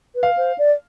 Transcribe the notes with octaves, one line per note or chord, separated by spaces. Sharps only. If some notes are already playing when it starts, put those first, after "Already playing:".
B4
F5
C5
D5